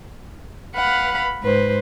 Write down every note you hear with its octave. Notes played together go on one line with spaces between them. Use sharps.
B4 F5 F#5 B5
G#2 B4 C5